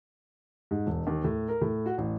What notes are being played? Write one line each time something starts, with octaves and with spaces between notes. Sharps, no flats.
G#2
E1
D#2
A2
A#4
A2
F#4
A1